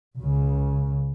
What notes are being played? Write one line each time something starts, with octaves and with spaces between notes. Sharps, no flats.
C#2 C#3